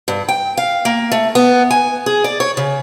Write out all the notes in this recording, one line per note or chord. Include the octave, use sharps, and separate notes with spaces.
G2
G5
F5
A#3
A3
B3
G#5
G#4
D5
C#5
C#3